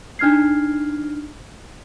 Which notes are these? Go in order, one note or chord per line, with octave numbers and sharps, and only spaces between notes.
D4 D#4 F6 G#6 C7